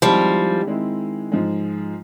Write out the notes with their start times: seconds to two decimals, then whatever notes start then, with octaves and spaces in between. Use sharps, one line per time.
0.02 D#3 F3 G3 G#3 C4 E4
0.66 D#3 G#3 C4 E4
1.32 G#2 F3 G#3